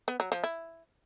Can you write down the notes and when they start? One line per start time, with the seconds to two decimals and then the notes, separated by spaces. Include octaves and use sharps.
0.08 B3
0.20 F#3
0.32 F3
0.44 E4